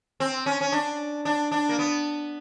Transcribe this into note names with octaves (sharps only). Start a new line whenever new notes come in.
C4
C#4
C#4
D4
D4
D4
A#3
B3